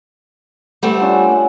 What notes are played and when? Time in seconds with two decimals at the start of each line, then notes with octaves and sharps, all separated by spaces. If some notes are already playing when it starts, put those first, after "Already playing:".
0.83 G3 A3 C4 F#5
1.01 C#4 D4 F4
1.32 F#5